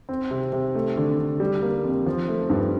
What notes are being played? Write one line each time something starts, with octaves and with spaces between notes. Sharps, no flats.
C4
C3
C3
A3
D3
D3
G3
A#3
F2
F3
A3
G2